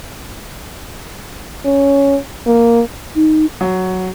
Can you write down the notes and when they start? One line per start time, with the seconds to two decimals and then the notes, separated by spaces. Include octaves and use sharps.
1.65 C#4
2.46 A#3
3.15 D#4
3.61 F#3